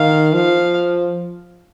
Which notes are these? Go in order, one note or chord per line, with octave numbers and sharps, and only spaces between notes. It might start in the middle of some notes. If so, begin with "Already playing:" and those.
Already playing: D#3 F5
F3 F5